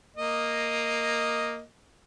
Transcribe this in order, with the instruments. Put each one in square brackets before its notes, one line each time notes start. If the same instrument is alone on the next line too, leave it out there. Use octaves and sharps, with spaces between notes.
[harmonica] A#3 D#5